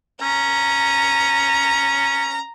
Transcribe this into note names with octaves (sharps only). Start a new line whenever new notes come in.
C#4 A#5